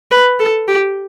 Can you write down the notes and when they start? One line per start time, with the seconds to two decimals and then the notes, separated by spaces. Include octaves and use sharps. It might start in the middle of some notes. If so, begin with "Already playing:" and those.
0.11 B4
0.40 A4
0.68 G4